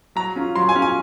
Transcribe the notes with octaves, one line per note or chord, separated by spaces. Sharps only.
F#3 A#5
C#4 F4
F#3 C6
G#5
C#4 F4
G#5